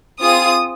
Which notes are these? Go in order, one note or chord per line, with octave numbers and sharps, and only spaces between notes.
C4 F4 G#4 D#6